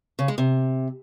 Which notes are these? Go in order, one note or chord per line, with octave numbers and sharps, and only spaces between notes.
C#3
G#3
C3